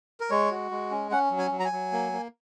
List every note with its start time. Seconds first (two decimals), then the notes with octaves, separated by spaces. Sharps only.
0.20 A#4
0.30 G#3 C#5
0.51 F#4
0.71 G#3
0.91 C#4
1.11 C#4 F#5
1.31 F#3
1.39 G#5
1.51 F#3
1.60 A#5
1.65 G#5
1.72 F#3
1.93 A#3
2.12 A#3